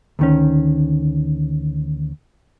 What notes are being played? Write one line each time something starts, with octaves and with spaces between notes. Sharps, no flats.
D2 D#3 C#4